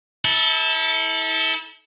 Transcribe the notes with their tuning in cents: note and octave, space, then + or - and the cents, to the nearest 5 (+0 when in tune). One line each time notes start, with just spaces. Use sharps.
E4 -40 A4 +0